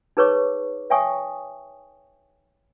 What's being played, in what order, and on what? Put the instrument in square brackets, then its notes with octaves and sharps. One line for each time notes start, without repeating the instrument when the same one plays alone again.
[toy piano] D#4 G#4 B4 C#5 C#6 D6
C#5 E5 G5 G#5 C#6 D#6